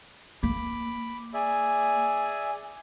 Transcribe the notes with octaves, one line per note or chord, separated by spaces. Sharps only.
A#3 B5 D6
G#4 D5 E5 G#5